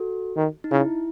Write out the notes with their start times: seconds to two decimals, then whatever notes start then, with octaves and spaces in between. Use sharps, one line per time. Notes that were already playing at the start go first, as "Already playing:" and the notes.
Already playing: F#4 A4
0.37 D#3
0.64 D#4
0.71 C#3 E4